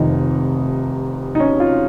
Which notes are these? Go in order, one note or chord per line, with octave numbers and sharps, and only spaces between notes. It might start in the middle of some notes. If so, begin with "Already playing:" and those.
Already playing: F1 F2 C3 D#3 D#4
D#4
C#4
F4